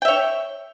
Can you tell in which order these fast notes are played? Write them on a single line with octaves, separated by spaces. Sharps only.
G5 E5 C#5